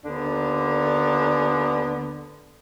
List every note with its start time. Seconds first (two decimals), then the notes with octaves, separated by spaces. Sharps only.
0.05 D#2 D3 B3 D4